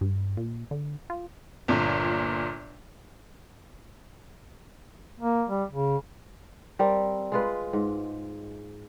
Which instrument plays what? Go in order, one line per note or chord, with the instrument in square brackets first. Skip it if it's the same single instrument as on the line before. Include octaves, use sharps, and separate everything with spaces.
[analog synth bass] G2
A#2
D3
F4
[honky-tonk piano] G1 A#2
[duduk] A#3
G3
C#3
[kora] G3 C4 A#4
G#3 F4 B4
G#2